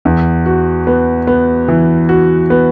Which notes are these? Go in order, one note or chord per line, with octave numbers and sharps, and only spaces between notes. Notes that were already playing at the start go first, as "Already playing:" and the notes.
E2
F#4
B3
B3
E3
F#4
B3